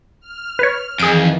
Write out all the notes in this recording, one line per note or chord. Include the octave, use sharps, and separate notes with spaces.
F6
B4 C#5
F2 D#3 E3 G#4 D7